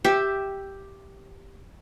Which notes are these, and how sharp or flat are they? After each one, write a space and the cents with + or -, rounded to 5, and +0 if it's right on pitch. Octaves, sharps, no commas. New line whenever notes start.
G4 +0 E5 +0